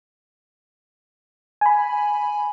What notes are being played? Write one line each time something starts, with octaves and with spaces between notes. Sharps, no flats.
G#5 B5